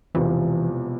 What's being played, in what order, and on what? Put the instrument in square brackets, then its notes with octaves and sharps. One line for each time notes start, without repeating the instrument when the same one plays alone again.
[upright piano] E1 E2 C3 F3 [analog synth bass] E3